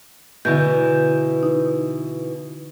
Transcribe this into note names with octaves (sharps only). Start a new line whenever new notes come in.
B2 D3 E3 G6
D#4